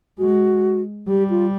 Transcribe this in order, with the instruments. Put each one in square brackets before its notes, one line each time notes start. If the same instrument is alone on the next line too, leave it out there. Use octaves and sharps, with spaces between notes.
[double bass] G#3 [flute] F#4
[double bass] G3 [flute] G4
[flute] F4